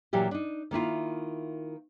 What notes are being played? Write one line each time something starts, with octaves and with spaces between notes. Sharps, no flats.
A#2 E3 F#3 G4
D4 D#4
D#3 A#3 E4 F4